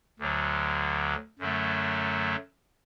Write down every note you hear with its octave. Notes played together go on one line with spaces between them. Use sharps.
D2 D3 F#3
F#2 D3 F#3 A3